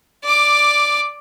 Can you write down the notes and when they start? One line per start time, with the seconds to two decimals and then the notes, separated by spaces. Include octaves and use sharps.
0.24 D5 D6